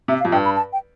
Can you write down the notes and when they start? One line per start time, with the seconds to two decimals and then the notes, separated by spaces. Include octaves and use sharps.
0.08 C3 E5
0.20 F5
0.25 F2
0.32 G2 G5
0.45 B5
0.56 A5
0.73 G5